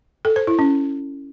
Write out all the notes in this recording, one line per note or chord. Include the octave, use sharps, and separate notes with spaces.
A4
C5
E4
C#4